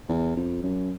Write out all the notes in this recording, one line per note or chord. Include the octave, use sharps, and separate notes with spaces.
E2
F2
F#2